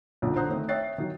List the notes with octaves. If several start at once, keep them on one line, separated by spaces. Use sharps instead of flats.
B1 A#2 D3
D3 C5 A#5 D#6 F#6
D#3 A3 C4
C#5 E5 G5 F#6 A6 C7
D#3 F#3